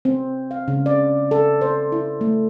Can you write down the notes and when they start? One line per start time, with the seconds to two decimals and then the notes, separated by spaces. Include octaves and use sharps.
0.05 C4
0.51 F5
0.68 C#3
0.86 D5
1.31 A4
1.61 C5
1.92 E4
2.21 A3